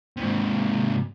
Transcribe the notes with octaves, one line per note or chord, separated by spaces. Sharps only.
G#2 C3